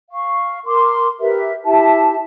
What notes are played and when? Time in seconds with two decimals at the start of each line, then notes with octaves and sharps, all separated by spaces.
0.11 F5 C#6
0.66 A#4 C6 D6
1.19 G4 A#4 B4 E5
1.64 E4 G4 E5 A5